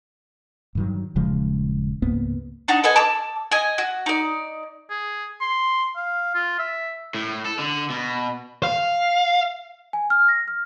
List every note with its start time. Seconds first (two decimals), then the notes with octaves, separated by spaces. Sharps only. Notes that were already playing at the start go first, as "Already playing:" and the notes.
0.75 G2 D#3 F#3
1.16 D#1 C#3 F3 G#3
2.02 C#2 G#2 A#3 B3
2.68 D4 D#4 F#5
2.84 A4 B4 D#5 G#5
2.96 A5 D6 E6
3.51 D#5 G#5
3.78 F#4
4.06 D#4 D5
4.90 G#4
5.41 C6
5.96 F5
6.35 F4
6.59 E5
7.14 A2
7.45 A4
7.59 D3
7.90 B2
8.63 F5
9.93 G#5
10.10 F6
10.28 A#6
10.48 F6